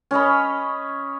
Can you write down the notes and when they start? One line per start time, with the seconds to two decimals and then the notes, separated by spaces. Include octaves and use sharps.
0.11 C#4 C#5 D#5 B5